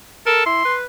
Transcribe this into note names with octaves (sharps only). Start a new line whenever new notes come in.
A4 A#4
E4 C6
B4